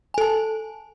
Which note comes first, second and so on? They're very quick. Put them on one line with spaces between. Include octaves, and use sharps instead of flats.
G#5 A4 A5